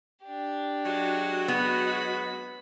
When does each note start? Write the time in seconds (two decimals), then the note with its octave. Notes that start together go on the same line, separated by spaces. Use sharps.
0.24 D4 G4
0.86 F#3 G#3 F#4
1.48 B3 B5